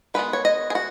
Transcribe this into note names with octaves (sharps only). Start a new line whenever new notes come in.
D#3 G#3 B3 B4
C#5
D#5
G#4
F#4